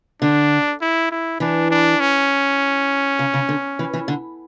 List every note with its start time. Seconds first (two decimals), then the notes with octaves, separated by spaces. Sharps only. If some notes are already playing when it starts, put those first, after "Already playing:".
0.22 D3 D4
0.81 E4
1.11 E4
1.40 E3 D4
1.71 D4
2.00 C#4
3.19 C#3
3.34 C#3
3.49 D3
3.79 E3
3.93 E3
4.08 D3